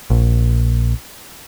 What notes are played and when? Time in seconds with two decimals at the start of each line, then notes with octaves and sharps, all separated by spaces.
0.10 A#1